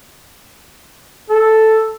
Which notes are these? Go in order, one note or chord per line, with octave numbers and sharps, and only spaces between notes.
A4